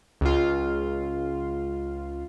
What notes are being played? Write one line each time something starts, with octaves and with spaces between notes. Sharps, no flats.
C#2 F4